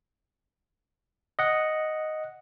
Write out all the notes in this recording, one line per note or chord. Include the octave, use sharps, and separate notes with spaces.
D#5 F#5